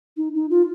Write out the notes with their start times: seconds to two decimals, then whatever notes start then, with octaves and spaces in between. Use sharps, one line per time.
0.17 D#4
0.34 D#4
0.50 F4